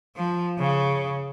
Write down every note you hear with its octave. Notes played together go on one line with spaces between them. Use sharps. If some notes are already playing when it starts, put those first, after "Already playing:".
F3
C#3